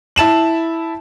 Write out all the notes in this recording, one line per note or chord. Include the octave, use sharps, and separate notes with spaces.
E4 A5 E7 F#7